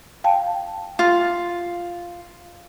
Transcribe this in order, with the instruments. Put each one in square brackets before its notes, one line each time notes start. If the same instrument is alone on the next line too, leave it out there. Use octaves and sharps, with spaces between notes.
[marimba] F5 G5 A5
[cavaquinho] F4